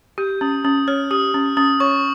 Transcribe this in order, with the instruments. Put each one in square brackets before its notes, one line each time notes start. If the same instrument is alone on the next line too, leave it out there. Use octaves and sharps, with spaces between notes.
[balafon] G4 [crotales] G6
[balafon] C#4 [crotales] D#6
[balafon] C#4 [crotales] D#6
[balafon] C#5 [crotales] F6
[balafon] G4 [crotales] D#6
[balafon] C#4
[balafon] C#4 [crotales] D#6
[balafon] C#5 [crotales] C#6